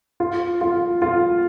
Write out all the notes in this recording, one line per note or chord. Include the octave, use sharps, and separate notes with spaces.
F4
F4
F4